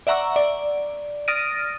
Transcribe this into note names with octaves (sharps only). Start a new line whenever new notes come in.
D5 E5 F#5 A#5 C#6 E6
D5
D#6 F6 A6 A#6 D7 D#7